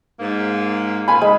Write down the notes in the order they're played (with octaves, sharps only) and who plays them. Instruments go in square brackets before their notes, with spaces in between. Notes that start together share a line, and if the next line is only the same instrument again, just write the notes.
[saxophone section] G#2 A#3
[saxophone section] A#2 F4 [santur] G#5 B5
[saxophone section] G#2 C#3 [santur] G#3